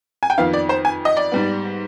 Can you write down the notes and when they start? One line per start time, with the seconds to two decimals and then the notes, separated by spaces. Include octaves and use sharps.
0.23 G#5
0.30 G5
0.38 F2 D#3 B3 F5
0.53 D5
0.69 C5
0.85 G#5
1.05 D#5
1.17 D5
1.32 G#2 G3 B3